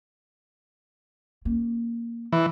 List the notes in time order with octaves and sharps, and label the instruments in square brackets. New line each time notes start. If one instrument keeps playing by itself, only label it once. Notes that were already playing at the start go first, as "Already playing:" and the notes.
[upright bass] A#3 C#4
[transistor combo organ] E3